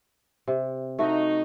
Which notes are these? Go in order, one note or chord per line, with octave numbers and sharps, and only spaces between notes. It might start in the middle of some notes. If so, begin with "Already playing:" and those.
C3
A3 D#4 F#4